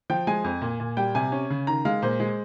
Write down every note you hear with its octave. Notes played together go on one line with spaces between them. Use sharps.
F3 G5
G#3 G#5
F2
A#2
A#2
G3 G5
C3 G#5
C#4
C#3
D#3 A#5
G#3 F5
A#2 C5
G#3